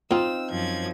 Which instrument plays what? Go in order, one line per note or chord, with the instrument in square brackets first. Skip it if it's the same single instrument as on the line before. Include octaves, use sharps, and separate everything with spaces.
[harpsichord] F2 F#3 [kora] C4 D#4 F4 [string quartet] E6
[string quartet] F#2 F3 G#6